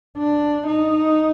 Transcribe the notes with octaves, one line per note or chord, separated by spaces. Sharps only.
D4
D#4